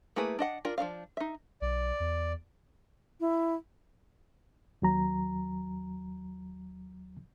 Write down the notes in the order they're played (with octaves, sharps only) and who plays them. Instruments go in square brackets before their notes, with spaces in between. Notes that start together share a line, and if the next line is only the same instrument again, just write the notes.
[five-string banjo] A3 A#3 E4 G#4 B4
D4 D#5 F#5
D4 F4 A#4
F3 A3 D4 F5
D#4 E5
[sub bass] B1 [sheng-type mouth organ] D5
[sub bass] E2
[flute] E4
[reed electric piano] D#2 F#3 A#5